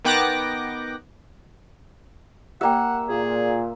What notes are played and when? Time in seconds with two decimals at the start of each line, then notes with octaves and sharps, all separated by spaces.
0.05 D#3 B3 G5 D6 F#6 A#6
2.61 A#3 G4 D5 E5 F#5 G5
3.08 A#2 G#4